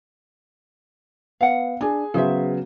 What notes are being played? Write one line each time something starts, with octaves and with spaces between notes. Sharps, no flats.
B3 F5 F#5
D4 G#4 G#5
C#3 F#3 B3 G#4 C5 E5